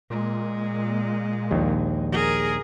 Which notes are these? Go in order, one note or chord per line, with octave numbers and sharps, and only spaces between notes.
A#2 G#3
A#1 D#2
G#4 A#4